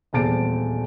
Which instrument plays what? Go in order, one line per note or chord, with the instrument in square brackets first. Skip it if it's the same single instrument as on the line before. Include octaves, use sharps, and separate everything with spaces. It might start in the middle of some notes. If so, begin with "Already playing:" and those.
[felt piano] D#1 E2 C4 A5 A6 D7